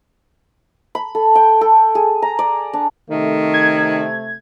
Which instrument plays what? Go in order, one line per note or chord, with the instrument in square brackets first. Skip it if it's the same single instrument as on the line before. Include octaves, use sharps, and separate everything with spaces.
[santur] B5
A4
G5
A4
G#4
A#5
D5
D4
[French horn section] C3 A3 [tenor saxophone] D#3
[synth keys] G#6